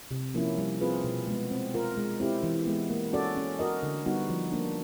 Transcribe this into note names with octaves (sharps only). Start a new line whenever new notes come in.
C3
F3 A#3 C#4 E4
G3
C4 F4 G#4 B4
B2
G#3 B3
C4
F4 A#4
G#3
C4 E4 G4
E3
G#3 B3
A#3
C#4 F#4 A4 D5
C#4
F#4 A#4 D#5
D3
G3 B3 D#4 F#4
F3
A#3 D4